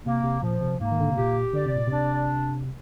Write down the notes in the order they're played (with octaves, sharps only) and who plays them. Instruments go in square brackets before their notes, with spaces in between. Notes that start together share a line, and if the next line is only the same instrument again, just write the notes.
[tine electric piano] C3 [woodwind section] A#3
[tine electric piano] C3
[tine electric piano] A#2 [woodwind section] F3
[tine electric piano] C3
[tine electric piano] G#2 [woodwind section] A#3
[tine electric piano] D#3
D3
C3
[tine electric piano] A#2 [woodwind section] G4
[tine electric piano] D3 [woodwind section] D5
[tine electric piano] C3
A#2
[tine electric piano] C3 [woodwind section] D4